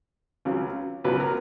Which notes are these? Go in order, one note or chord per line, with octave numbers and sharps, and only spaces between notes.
C#2 C#3 F#3
C#2 B2 F#3 B4
A#4